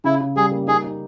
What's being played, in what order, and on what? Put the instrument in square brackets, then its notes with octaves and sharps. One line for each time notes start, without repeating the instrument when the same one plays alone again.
[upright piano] C#3 [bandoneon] E4
[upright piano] C#3
[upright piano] G3 [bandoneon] G#4
[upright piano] A#3
[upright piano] D#4 [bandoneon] G#4
[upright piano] D#4